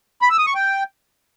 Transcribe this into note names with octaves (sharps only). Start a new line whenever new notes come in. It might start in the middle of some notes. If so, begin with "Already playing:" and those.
B5
E6
D#6
C#6
G5